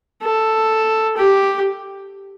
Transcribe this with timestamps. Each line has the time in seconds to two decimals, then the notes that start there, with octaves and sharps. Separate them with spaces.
0.22 A4
1.17 G4